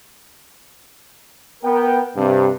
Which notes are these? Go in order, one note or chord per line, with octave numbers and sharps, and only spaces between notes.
B3 A#4 G5
G2 C3